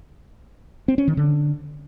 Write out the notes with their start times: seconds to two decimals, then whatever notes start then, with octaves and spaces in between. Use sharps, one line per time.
0.88 C4
0.98 C#4
1.08 D#3
1.17 D3